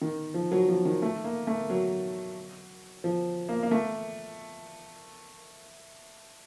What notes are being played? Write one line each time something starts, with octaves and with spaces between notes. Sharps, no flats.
D#3
F3
F#3
F3
D#3
A3
A#3
A3
F#3
F3
A#3
A#3
A3